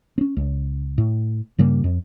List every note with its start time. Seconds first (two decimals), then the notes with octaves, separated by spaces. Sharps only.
0.18 C4 C#4
0.37 C#2
0.98 A2
1.59 G2 C#3 G3 A#3
1.84 F2